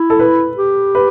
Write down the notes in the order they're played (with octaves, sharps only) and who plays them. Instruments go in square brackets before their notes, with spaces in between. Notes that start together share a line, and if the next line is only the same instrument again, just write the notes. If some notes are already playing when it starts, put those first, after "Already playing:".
Already playing: [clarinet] E4
[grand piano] A4
B4
[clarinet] G4
[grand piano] B4